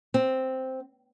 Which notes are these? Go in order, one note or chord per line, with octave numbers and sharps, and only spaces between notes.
C4